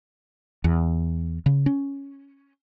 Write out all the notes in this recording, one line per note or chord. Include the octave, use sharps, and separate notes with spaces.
E2
C#3
C#4